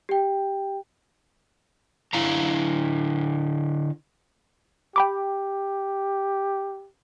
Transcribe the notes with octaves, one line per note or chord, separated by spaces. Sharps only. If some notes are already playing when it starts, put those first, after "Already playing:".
G4 G5
D3 E4 F5 A#5
G4 G5 B5 D6